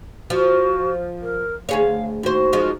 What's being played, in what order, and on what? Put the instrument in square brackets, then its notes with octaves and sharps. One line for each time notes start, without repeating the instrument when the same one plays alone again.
[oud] F3 [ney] F#4
[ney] A#4
[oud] D2 G#4 C#5 [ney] F5
[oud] D#2 C5 [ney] F#4
[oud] F3 G#3 D#4